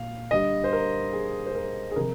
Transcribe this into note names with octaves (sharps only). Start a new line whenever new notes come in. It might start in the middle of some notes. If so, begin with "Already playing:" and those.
Already playing: A#2 F5
D3 G3 D#5
C5
A#4
G#4
C5
A#4
G#4
C3 F3 A#4